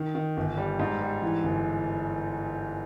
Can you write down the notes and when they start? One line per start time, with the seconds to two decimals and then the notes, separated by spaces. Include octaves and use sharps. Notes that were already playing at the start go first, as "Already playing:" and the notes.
Already playing: D#3
0.15 D#3
0.37 G1
0.57 G3
0.79 G#2
1.01 G3
1.22 E3
1.44 G1